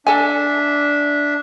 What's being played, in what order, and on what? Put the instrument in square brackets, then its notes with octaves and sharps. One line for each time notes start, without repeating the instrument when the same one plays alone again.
[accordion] D4 E5 [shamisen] A4 G#5